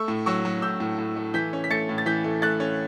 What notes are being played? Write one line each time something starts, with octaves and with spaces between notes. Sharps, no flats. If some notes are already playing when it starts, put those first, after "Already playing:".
Already playing: A3 C#6 E6
A2
F#3 C#6 E6
F#3
A2 E6 G6
A2
A2
A3
E3 G6 B6
C#4
B6
A3 A6 C#7
A2
A6
E3 G6 B6
A3
A3 F#6 A6
C#4